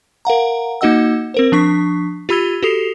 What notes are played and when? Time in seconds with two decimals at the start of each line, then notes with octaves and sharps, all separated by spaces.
0.25 A#4 F5 F#5 A#5
0.81 A#3 D#4 F#4 D#5 F#5 E6
1.34 C4 A#4 C5
1.52 F3 D4 C#6 B6
2.29 F4 G4 B5 E6 G#6 G7
2.63 F#4 G4 A4 D#6 C7 F7